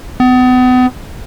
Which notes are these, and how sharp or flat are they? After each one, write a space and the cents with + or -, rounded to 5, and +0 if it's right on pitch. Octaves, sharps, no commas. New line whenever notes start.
B3 +35